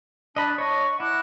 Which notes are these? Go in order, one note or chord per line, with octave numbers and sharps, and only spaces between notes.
D4 D#5 A5 B5 F#6
C#5 D#5 C#6
E4 F#5 D6 F#6